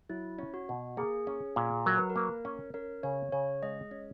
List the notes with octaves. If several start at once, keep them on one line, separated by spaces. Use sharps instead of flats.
F#3 E4
C#4
F#4
B2
A#3 G#4
C#4
A#2
F#3 A#4
B4
A#4
A#3
C#4
C#4 A#4
C#3 C#5
C#3 C#5
G#3 D#5
C#4